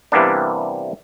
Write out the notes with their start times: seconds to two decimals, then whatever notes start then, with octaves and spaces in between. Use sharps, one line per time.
0.12 C3 E3 G3 A#3 B3 D4